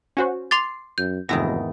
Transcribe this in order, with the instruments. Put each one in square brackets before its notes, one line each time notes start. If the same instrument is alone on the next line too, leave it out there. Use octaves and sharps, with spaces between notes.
[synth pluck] C#4 F#4 C5
[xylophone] C6 D6 A6 [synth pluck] C7
[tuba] F#2 [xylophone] G6
[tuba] F1 [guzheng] E2 G#2 D#3 [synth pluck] A#6